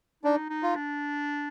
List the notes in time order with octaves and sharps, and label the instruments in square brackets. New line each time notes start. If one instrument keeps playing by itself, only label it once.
[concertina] D4 [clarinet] D#4
[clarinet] D#4
[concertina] F4
[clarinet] D4